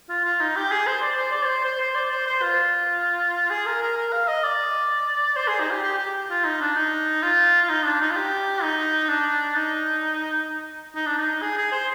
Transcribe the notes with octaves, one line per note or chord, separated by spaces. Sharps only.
F4
F4
D#4
G4
G#4
C5
D5
C5
D5
C5
C5
C5
D5
C5
C5
F4
G#4
A#4
A#4
A#4
F5
D#5
D5
C5
G#4
D#4
G4
G4
G4
F4
D#4
D4
D#4
F4
F4
D#4
D4
D#4
F4
G4
D#4
D4
D#4
D#4
D4
D#4
G#4
G#4
C5